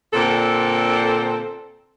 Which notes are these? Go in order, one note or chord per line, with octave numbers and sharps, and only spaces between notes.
A#2 D3 C4 A4